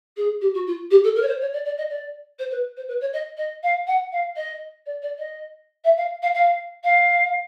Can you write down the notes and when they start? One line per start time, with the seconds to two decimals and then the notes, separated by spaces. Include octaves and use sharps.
0.17 G#4
0.41 G4
0.54 F#4
0.67 F4
0.90 G4
1.04 A4
1.15 A#4
1.22 C#5
1.27 C5
1.41 C#5
1.52 D5
1.65 D5
1.77 D#5
1.89 D5
2.38 C5
2.51 B4
2.76 C5
2.88 B4
3.00 C#5
3.13 D#5
3.37 D#5
3.63 F5
3.87 F#5
4.12 F5
4.36 D#5
4.86 D5
5.02 D5
5.18 D#5
5.84 E5
5.97 F5
6.22 F5
6.34 F5
6.84 F5